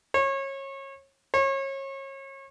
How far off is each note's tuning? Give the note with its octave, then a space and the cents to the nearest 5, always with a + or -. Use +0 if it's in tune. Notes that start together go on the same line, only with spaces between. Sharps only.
C#5 -25
C#5 -30